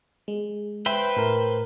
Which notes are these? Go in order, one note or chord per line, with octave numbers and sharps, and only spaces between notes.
G#3
B4 C5 E5 G5
A2 A#4